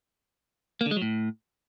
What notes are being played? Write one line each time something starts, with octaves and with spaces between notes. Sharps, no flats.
A#3
D3
G#3
F#3
A2